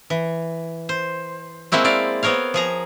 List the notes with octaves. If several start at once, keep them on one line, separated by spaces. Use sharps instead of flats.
E3
C5
G#3 A#3 C4 E4 F#4
E4 D5 F5
B3 C4 A#4 C#5 F5
F3 G#4 A#5